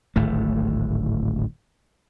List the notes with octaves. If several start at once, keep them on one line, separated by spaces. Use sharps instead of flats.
D1 G#1 A2 A3